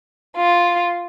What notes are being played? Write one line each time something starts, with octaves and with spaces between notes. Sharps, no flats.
F4